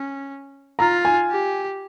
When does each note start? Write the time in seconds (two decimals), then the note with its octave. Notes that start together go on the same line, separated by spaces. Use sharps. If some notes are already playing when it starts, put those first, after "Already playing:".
Already playing: C#4
0.79 F4 A#5
1.05 G#5
1.30 G4